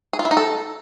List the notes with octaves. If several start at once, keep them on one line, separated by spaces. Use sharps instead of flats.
G#4
F4
E4
D#4
A4